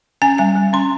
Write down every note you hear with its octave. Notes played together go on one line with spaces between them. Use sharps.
C#4 G#5
G3 G#5
G3
C#4 C6